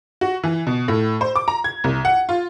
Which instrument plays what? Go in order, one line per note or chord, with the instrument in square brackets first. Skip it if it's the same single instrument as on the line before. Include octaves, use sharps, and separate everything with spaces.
[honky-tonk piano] F#4
E3
B2
A2
C5
D6
A#5
G#6
C2
F#5
F4